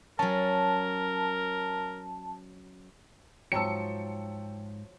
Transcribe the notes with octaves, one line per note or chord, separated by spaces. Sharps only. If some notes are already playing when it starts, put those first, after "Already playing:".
F#3 C#4 A#4 A5
E2 G#2 F3 F#3 G5 A5 E6 C#7